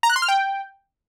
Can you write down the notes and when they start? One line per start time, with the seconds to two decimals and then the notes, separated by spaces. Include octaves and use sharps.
0.03 A#5
0.10 F#6
0.16 C6
0.22 F6
0.28 G5